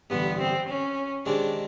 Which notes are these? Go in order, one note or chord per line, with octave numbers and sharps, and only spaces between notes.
A1 G2 D3 B3
C4
C#4
C3 D#3 G#3 C4 D4